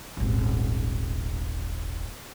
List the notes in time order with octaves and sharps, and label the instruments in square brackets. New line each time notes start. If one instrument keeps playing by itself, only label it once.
[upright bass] D#1 G#1